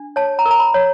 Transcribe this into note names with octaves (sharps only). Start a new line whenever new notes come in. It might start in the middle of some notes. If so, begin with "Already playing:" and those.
Already playing: D4
C#5 A5
A#5
A#4
A#5
B5
C#5